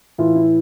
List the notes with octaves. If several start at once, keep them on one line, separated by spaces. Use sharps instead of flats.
A2 E3 F4
E4